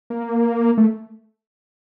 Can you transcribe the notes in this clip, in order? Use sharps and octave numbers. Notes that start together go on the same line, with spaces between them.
A#3
A3